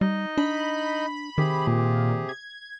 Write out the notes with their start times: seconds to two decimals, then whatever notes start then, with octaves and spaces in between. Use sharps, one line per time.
0.01 G3 D#4 D#5
0.38 D4 B5
1.38 C3 D#3 G4 G#4
1.67 A#2
2.29 G#6